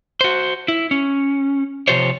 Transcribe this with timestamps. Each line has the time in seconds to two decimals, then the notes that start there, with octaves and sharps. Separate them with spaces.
0.21 F#4 C5
0.68 E4
0.91 C#4
1.88 C3 D#3 F3 G4 C5 C#5